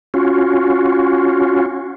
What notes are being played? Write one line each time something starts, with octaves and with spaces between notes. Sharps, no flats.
C#4 F4 F#4